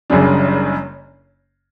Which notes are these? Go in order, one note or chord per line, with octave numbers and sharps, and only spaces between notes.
F#1 F#2 C#3 G3 D4